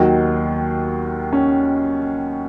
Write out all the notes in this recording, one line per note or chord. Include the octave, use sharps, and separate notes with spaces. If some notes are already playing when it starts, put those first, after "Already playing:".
Already playing: D#2 D#3 F#3 F#4
C#4